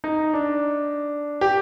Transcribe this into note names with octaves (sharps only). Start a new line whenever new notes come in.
D#4
D4
G4